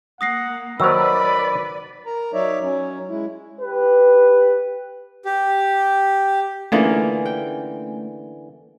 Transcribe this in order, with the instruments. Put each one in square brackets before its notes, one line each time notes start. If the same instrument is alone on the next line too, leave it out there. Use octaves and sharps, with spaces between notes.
[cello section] A#3 [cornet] F#5 [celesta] D#6 A#6 C7
[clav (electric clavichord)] D#3 F#3 [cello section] B4 D5 [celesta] C5 E6 [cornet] B5
[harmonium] A#4 A#5
F#3 D#4 C#5 D5 E5
F#3 C#4
G#3 E4
[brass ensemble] G4 B4
[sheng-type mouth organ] G4
[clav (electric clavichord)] D3 E3 [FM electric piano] A3 C#4 G#5 [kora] A#3 F4 G#4
[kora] G5